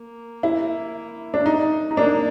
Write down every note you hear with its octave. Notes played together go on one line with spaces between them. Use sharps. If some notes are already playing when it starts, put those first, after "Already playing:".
Already playing: A#3
E4
D4
D#4
D#4
A#3 D4